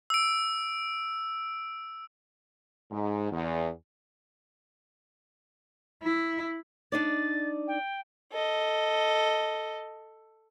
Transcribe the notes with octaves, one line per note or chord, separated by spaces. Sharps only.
E6 D7
G#2
E2
E4
D4 D#4 D5 A6
G5
A4 D#5